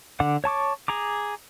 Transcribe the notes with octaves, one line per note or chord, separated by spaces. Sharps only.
D3 F#5 D6
C#5 A5 C#6 D6
G#4 A#5 D6